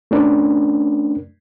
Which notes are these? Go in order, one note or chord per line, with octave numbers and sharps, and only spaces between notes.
A3 C#4 D4 A#4